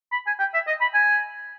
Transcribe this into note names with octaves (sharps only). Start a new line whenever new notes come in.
B5
G#5
G5
E5
D#5
B5
G#5